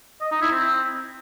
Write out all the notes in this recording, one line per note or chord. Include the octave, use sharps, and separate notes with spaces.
D#5
D#4
E4
C4